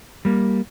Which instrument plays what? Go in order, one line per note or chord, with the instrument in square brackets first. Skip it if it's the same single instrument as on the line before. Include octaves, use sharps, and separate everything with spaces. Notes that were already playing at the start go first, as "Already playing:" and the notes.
[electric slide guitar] G3 A#3